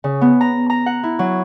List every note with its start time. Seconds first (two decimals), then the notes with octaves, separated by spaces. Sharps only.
0.04 C#3
0.21 B3
0.41 A#5
0.70 A#5
0.86 F#5
1.03 E4
1.19 F#3